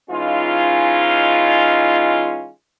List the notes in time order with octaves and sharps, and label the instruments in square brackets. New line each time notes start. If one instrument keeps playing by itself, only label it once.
[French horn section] E3 G#3 C#4 D#4 F4